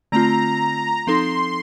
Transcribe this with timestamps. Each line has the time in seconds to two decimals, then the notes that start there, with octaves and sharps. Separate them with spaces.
0.12 D3 A3 C4 F4 A#5
1.07 F3 C4 D#4 A4 C6